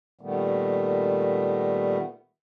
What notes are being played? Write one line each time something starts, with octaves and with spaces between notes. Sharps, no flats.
A#2 D#3 G3 A3 B3